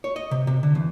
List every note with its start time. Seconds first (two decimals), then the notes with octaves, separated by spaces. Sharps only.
0.04 C#5
0.16 D#5
0.31 C3
0.47 C3
0.63 D3
0.75 E2